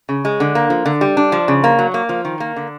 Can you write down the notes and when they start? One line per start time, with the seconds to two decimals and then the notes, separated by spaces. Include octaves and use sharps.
0.09 C#3
0.25 G#3
0.40 D3
0.55 A#3
0.70 F3
0.86 D3
1.01 G3
1.17 D4
1.32 F3
1.48 C#3
1.64 A#3
1.79 F#3
1.94 A#3
2.09 F3
2.25 D#3
2.40 A#3
2.56 D3